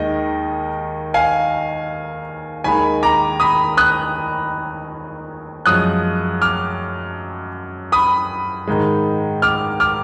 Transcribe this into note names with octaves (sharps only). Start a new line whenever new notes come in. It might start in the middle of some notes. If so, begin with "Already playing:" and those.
Already playing: D#2 D#3 G#3 D#5
F5 G#5
D#2 D#3 G#3 G#5 B5
A#5 D6
B5 D#6
D#6 F#6
F#2 F3 G#3 D#6 F#6
D6 F6
B5 D#6
G#2 D#3 G#3
D6 F6
D6 F6